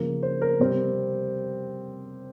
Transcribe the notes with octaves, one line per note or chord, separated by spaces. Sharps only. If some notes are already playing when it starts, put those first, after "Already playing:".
Already playing: C#3 F3 A#3 A#4
C5
A#4
C3 G3 C4